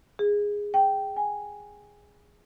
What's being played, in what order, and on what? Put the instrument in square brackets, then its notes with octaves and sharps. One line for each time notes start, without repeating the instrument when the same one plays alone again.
[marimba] G#4
G5
G#5